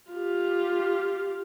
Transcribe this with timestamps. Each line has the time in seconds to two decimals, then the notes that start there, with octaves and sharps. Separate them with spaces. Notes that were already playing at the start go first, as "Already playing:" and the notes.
0.11 F4 G4